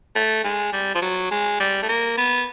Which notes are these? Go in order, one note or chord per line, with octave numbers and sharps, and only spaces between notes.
A3
G#3
G3
F3
F#3
G#3
G3
A3
A#3
B3